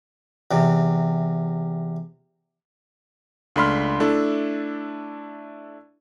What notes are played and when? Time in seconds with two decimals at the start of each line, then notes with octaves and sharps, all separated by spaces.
0.51 E2 C3
3.56 C#2 A3 D4 B5 C6 F6
4.00 A3 D4 E4 A4